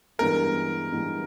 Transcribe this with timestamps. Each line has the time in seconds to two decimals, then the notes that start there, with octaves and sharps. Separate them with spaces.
0.19 G2 E3 G#3 B3 A#4
0.92 G2 E3 G#3 B3